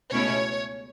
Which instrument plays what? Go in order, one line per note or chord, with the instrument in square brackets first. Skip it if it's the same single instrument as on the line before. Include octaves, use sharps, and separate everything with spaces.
[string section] C#2 B2 A3 C#4 E4 C#5